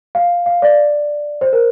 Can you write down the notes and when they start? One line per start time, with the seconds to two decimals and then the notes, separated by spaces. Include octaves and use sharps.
0.15 F5
0.46 F5
0.62 D5
1.41 C5
1.53 A#4